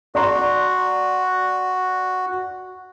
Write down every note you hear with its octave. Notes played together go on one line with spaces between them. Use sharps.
F#4 D5 A#5 C6